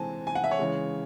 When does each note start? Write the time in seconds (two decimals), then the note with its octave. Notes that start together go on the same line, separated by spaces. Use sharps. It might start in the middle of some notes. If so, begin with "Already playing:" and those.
Already playing: C3 E3 G#3 C4 G#5 A5
0.27 G#5
0.35 F#5
0.44 E5
0.51 C#5
0.59 C#3 E3 G#3